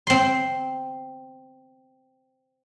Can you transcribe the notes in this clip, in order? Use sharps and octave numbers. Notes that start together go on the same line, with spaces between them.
C4 C6